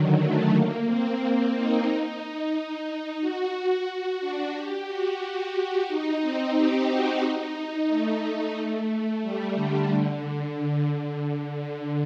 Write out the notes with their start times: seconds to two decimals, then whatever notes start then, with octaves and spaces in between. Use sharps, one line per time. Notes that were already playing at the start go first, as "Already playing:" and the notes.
Already playing: D3 D#3 F#3
0.20 A3
0.53 A#3
0.87 C4
1.20 C4
1.53 D#4
3.21 F#4
3.87 F#4
4.21 D4
4.54 G4
4.88 F#4
5.21 F#4
5.55 F#4
5.88 D#4
6.21 C4
6.55 G4
6.88 F#4
7.22 D#4
7.88 A3
9.22 G3
9.55 D3
9.89 D3
10.56 D3
10.89 D3
11.22 D3
11.56 D3